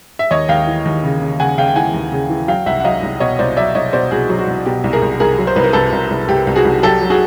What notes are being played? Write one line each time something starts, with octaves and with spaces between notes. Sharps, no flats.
E5
D#2 C#5 D#5
D#2 F5 G5
E3
D#2
C#3
C#3
C#3 F#5 G#5
C#3 F5 G5
G5
E3 F#5 G#5
D#2
C#3
E3
F#3 F5 G5
C2 E5 F#5
F#5
F#3 D#5 F5
C2
B2 C#5 D#5
C2 C5 D5
F#3 D5 E5
C2 C#5 D#5
B2 C5 D5
C2 F#4 G#4
F#3
F#4
C2
B2 G4
C2
G#4 A#4
C2
C2 G#4 A#4
F#3
C5
C2 B4
A#4
C2 A4 B4
C2
C2
C2 G4
C2
F#4 G#4
C2
F#3 G4 A4
F#3
F#4 G#4